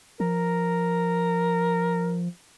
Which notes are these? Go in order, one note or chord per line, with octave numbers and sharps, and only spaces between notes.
F3 A#4